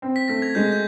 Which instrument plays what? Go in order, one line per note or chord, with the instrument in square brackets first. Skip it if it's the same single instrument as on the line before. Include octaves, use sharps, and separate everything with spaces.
[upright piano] C4
[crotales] B6
[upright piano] A3 [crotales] A#6
[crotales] G#6
[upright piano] G#3 [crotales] G6
[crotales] G6